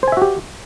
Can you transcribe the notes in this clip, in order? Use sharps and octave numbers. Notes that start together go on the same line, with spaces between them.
F#4 G4 C5 E5 G#5